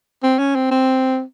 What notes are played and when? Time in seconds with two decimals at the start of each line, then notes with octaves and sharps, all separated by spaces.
0.23 C4
0.39 C#4
0.55 C4
0.71 C4